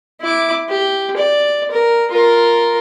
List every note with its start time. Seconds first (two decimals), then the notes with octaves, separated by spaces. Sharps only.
0.21 E4 D6
0.69 G4
1.17 D5
1.71 A#4
2.11 F4 A#4